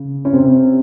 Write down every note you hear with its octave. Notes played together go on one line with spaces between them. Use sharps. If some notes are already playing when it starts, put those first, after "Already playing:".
Already playing: C#3
C#4
C3 C4